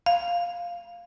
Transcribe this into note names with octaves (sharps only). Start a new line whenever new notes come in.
F5